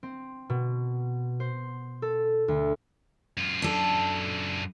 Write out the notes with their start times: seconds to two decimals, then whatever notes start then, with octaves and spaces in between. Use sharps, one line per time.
0.03 C4
0.50 B2
1.40 C5
2.02 A4
2.48 D2
3.37 F#2 F4
3.62 D4 A4